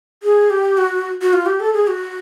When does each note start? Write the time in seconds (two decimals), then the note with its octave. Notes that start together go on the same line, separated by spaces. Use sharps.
0.23 G#4
0.50 G4
0.78 F#4
1.22 F#4
1.33 F4
1.46 G4
1.60 A4
1.73 G#4
1.87 F#4